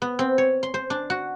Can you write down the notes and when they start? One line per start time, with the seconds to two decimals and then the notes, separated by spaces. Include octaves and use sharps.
0.02 B3
0.19 C4
0.38 C#5
0.63 C6
0.74 C5
0.90 D4
1.10 F#4